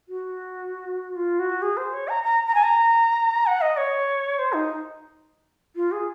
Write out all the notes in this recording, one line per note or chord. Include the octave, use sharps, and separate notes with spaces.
F#4
F4
F#4
G#4
C5
C#5
A#5
A#5
A#5
G#5
A#5
F#5
D#5
C#5
C5
D#4
F4
G#4